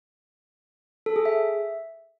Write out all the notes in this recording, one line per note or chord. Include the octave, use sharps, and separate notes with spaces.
A4
G#4
E5